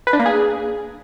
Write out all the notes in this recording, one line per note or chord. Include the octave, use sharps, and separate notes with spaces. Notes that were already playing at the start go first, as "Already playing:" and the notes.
B4
D4
A#3
G#4